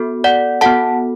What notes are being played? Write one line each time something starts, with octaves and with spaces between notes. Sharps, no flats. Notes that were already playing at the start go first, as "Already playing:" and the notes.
Already playing: B3 F#4 A4
D5 F#5
B3 F#4 A4 F#5 A5